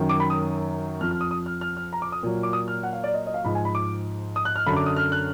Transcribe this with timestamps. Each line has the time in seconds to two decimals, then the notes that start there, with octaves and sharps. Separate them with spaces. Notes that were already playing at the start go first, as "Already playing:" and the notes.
Already playing: F#2 D#3 F#3
0.09 D6
0.20 B5
0.30 D#6
1.01 F2 F3 F6
1.11 F6
1.21 D#6
1.31 D#6
1.46 F6
1.61 F6
1.77 F6
1.93 A#5
2.02 D6
2.12 D#6
2.23 A#2 F#3
2.43 D6
2.53 D#6
2.68 F6
2.83 F#5
2.93 F5
3.04 D5
3.14 D#5
3.27 D#5
3.34 F5
3.44 G#2 F3 B5
3.55 G#5
3.65 B5
3.75 D6
4.36 D#6
4.45 F#6
4.56 F6
4.66 F#2 D3 F#3 B5
4.77 D6
4.86 D#6
4.96 F6
5.12 F#6